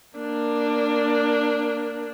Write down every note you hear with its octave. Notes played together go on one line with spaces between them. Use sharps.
A#3 D4